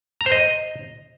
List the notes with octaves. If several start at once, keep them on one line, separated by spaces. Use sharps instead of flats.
A#5
C5
D#5